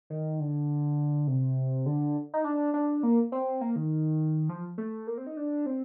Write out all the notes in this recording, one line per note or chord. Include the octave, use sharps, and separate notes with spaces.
D#3
D3
C3
D3
D#4
D4
D4
A#3
C4
A#3
D#3
F3
A3
A#3
C4
D#4
D4
C4